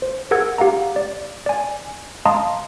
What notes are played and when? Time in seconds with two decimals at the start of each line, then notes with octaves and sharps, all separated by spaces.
0.02 C5
0.31 G#4 A#4 F#5 E6 G#6
0.58 G4 F5 F#5 A#5
0.96 D5
1.46 D5 G#5
2.25 D#5 F5 A5 A#5 C6 D#6